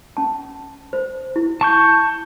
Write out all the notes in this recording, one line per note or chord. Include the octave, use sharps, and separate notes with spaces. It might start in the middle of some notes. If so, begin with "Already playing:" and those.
C#4 A5
C5
E4
A5 C#6 G6